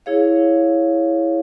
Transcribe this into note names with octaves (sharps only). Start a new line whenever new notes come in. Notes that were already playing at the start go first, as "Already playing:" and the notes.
E4 G#4 C#5 F5